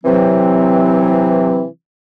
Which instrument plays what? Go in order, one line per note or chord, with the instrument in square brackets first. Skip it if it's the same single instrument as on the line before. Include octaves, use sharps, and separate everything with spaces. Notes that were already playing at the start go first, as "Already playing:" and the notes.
[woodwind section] C3 E3 F#3 C4